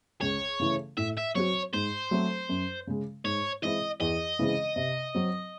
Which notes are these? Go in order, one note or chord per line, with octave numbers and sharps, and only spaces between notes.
C#2 C#5
C#3 E3 A3
A2 E5
E5
F#3 C4 F#4 C#5
G#2 C5
F#3 A3 C4
F#2
C#3 G#3
G#2 C#5
E3 G#3 C4 E4 D#5
E2 D#5
C#3 E3 G#3 C4
C3
F#3 C4